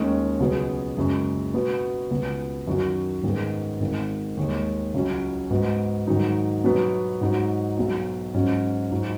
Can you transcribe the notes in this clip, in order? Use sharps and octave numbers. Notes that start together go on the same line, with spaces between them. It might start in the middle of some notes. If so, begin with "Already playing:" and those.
Already playing: D#2 D#3 G#3 C#4
C#2 B2 F#3 B3 G#4
F#1 F#2 C#3 G#3
B2 B3 F#4
C#2 B2 B3
F#2 D#3 F#3 C#4 F#4
G#2 D#3 B3 G#4
G#1 G#2 D#3
D#2 D#3 G#3
C#2 C#3 F#3 C#4
G#2 G#3 B3 F#4
G#2 D#3 F#3 D#4
B2 F#3 B3
G#2 F#3 D#4 F#4
B1 B2 F#3
G#2 F#3 C#4
G#2 F#3 D#4 F#4